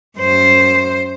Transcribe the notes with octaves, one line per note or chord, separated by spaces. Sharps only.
F#2 C5